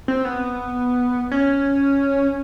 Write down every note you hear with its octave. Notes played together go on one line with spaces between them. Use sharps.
C4
B3
C#4